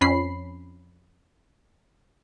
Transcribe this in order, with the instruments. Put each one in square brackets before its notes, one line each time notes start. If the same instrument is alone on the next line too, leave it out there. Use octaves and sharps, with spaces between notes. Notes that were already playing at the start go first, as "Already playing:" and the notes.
[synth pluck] F2 C#4 B5 C7